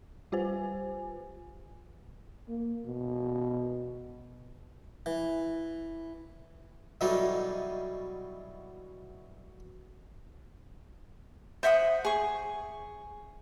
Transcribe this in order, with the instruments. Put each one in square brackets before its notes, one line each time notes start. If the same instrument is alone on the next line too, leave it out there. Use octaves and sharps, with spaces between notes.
[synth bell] G3 F4 G4 B4 C5 G#5
[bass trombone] A#3
B2
[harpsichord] E3
B2 E3 F#3 G3 D#4 A4
[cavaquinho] C5 E5 F#5 D#6
G#4 C#6